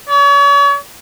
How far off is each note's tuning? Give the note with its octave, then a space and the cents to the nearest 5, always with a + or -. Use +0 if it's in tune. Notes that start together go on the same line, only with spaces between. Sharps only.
C#5 +40